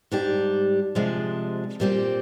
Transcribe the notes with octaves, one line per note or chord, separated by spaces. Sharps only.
G#2 G3 D4 G4
C3 F3 G#3 D4
A#2 G3 C4 G4